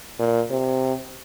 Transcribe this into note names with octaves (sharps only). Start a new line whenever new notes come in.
A#2
C3